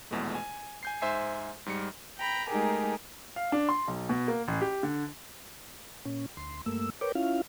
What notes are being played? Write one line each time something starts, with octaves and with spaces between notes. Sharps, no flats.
A#1 E2 B2 G#3 A3
G#5
G#5 G6 C7
G#2 C5 E5 G#5 C7
G#2 G3 C#7
G5 A#5 B5
G#3 A3 D#4 G4 G#4 A#4
F5
D4
C6
B1
B2
A#3
A1
G4
D3
A#2 C#4
D2 C6
G2 A3 A#3 E6
A#4 B4 C#5 G5 D6
C#4 E4 F4 F5